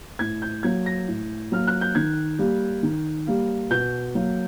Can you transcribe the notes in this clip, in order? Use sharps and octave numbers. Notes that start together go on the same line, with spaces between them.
A2 G#6
G6
F#3 A#3 G#6
A#6
A2
F#3 A#3 F6
F#6
G6
D#3 G#6
G3 A#3
D#3
G3 A#3
B2 G6
F#3 A#3